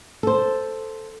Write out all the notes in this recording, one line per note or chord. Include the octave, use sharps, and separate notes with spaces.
A4 C5